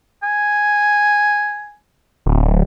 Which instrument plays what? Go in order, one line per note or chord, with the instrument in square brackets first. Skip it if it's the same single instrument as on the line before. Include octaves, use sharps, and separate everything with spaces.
[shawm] G#5
[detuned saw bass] D1